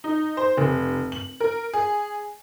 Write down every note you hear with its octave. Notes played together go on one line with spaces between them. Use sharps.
D#4
C5
F1
F#7
A#4
G#4